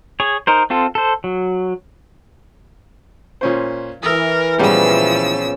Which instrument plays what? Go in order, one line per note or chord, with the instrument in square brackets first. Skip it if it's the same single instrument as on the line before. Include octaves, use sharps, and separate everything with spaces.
[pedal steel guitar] G#4 C#5
D#4 A#4 C5
C4 F4 A4
A4 C5
F#3
[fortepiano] A#2 C#4 C5
[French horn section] E3 [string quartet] A#4 [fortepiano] D#6 E6
[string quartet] A#2 F3 E6 [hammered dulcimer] C#3 B3 A#5 [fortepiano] G3